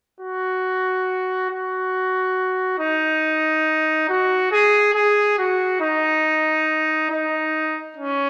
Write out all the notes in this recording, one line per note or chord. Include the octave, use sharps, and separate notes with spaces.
F#4
F#4
D#4
F#4
G#4
G#4
F#4
D#4
D#4
C#4